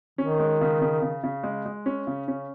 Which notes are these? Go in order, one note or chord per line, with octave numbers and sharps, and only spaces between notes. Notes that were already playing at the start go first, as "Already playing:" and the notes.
D#3 C#4
G#3
C#3
C#3
C#3
C#3
G#3
G#3
C#4
C#3
C#4